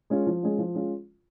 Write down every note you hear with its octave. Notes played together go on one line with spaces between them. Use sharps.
G#3 C#4 F4
F3
G#3 C#4 F4
F3
G#3 C#4 F4